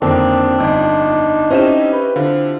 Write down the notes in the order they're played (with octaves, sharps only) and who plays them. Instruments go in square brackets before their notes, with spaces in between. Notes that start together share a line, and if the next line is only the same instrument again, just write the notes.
[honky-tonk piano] F2 [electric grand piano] D3 D#3 A#3 [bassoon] C4 [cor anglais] D4
[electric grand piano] G1 [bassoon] D#4
[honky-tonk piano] C4 E4 G4 [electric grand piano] C#4 D#5 E7 [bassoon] D#4
[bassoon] B4
[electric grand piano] D3 [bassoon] F4